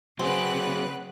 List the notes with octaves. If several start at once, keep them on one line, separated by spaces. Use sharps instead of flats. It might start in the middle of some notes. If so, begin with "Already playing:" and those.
C#3 F#3 C4 G#4 B4 F#5 F#6